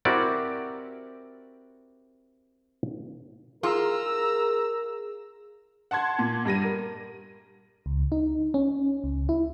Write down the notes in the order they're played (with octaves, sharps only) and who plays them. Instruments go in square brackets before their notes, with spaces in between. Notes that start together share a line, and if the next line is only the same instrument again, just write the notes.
[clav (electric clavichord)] C4 E4 F#4 G4 A#4 D5
[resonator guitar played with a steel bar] F4 [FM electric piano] G#4 [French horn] A#4 [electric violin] A#5 E6
[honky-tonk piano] F#5 A5 C6 G#6
A#2
G2 G3 A#6 D#7
A#4
[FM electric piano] C#2
D#4
C#4
C#2
E4